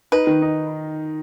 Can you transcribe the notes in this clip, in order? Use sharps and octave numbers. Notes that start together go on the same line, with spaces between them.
D#4 B4
D#3
D#4